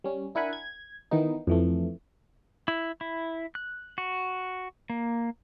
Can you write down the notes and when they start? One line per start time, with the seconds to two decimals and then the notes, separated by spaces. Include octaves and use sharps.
0.04 G3 C#4
0.35 D4 E4 A#4 F#5 G#5 B5
0.53 G#6
1.11 D#3 E3 B3 D#4
1.47 F2 E3 A3
2.68 E4
3.01 E4
3.55 F#6
3.98 F#4
4.90 A#3